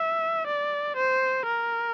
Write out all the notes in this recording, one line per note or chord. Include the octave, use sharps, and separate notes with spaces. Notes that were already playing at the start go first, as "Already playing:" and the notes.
Already playing: E5
D5
C5
A#4